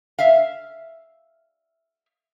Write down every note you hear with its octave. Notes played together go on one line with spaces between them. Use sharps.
E5 F5